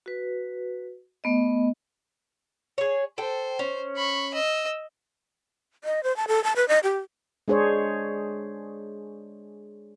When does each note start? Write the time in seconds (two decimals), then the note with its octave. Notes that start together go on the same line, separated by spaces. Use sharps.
0.06 F#4 B4
1.24 A3 B3 D#5
2.78 G#4 C#5
3.18 A4 C5 G5
3.59 C#4
3.96 B5 C#6
4.34 D#5 E6
5.84 D#5
6.03 C5
6.16 A5
6.28 A4
6.44 A5
6.56 B4
6.68 D#5
6.83 G4
7.48 G#3 D4 G#4 C5 C#5